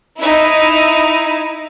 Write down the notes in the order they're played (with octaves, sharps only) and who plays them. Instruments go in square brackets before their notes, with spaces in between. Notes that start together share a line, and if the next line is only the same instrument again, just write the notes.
[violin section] D#4 E4